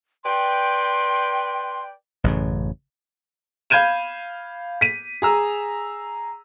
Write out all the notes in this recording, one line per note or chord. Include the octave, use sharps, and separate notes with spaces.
B4 D5 G5 C6
A1 F#2 C#3
F5 B5 G6 G#6 D#7 E7
B6 D#7
G#4 A#5 E6